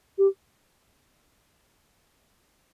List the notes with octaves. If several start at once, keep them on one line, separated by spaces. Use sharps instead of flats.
G4